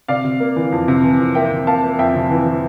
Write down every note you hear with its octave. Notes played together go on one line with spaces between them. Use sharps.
C3 D5 F5
C3
A#3
E3
F2
C3
E3
F2
A#3 E5 G5
C3
A#3 F5 A5
A#3
F2 E5 G5
C3
E3
E3